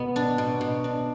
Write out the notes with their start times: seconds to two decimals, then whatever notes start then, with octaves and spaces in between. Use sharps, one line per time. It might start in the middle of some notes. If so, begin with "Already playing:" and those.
Already playing: B2 B3
0.16 D4
0.38 B2
0.61 B2
0.84 D4